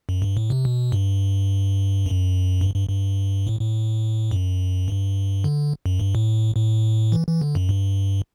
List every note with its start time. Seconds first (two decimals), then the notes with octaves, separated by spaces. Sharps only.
0.09 F#2
0.22 G2
0.37 A2
0.50 C3
0.65 B2
0.92 G2
2.06 F#2
2.61 G2
2.75 G2
2.89 G2
3.47 A2
3.61 A2
4.31 F#2
4.88 G2
5.44 D3
5.86 F#2
6.00 G2
6.15 A2
6.56 A2
7.12 E3
7.27 E3
7.42 D3
7.55 F#2
7.69 G2